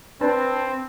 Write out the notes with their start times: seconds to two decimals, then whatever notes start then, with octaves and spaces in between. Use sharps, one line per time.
0.21 C4 D4 B4 A5